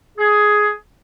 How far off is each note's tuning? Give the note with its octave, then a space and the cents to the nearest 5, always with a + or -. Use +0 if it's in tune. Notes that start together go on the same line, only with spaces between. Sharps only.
G#4 +10